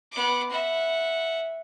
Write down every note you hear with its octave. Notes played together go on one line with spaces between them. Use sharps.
B3 D6
E5 F#5